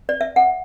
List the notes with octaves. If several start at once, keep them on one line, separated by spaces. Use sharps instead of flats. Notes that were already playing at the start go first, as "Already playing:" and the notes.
D5
E5
F#5